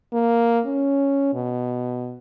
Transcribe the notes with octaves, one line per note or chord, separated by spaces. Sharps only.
A#3
C#4
B2